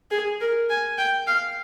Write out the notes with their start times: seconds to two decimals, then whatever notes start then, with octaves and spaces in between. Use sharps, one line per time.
0.11 G#4
0.41 A#4
0.70 G#5
0.98 G5
1.27 F5